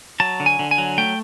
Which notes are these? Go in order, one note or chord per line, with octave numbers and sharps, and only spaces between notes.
F#3 A5
D3
G#5
D3
G#5
F#3
A3 G5